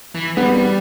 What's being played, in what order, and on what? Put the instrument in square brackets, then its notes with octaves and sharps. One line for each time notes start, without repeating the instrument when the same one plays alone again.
[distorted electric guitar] E3
[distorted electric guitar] G3 [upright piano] B3